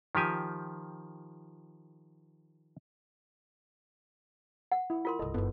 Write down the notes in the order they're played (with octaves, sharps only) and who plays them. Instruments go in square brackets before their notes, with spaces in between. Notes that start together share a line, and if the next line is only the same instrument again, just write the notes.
[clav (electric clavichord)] D#3 F3 G4 G#5
[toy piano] F#5
[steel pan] E4
[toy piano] F4 A#4 C6
[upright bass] G1 C2 [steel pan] A4 D#5
[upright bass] F#1 D#4 [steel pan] B3 A4